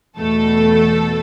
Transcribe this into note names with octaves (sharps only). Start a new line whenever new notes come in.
E2 B2 A3 A4